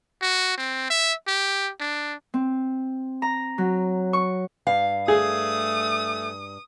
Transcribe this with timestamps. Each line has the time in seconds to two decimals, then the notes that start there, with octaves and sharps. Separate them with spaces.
0.22 F#4
0.58 C4
0.90 E5
1.27 G4
1.81 D4
2.34 C4
3.22 A#5
3.58 F#3
4.13 C#6
4.67 G2 F5
5.08 A3 G#4 D#6